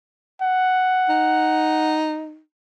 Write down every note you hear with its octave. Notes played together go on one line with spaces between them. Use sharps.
F#5
D#4